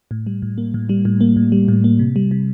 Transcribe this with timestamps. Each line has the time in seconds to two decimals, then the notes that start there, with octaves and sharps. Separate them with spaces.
0.11 A2
0.27 G3
0.42 A2
0.58 A#3
0.74 A2
0.89 G3
1.05 A2
1.21 A#3
1.37 A2
1.52 G3
1.68 A2
1.84 A#3
1.99 C3
2.16 G3
2.31 C3